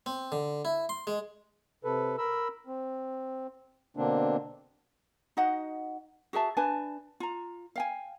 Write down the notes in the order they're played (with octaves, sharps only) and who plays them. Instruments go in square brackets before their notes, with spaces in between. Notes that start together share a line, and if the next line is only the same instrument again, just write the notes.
[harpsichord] C4
D3
E4
C6
G#3
[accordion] C3 A4 B4
A#4 B5 E6
C4
B2 D3 A#3 C4 D4
[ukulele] D#4 F#4 D#5 F#5
F#4 G#4 E5 A5
D4 B4 G#5 A5
F4 A#5
F5 G5 G#5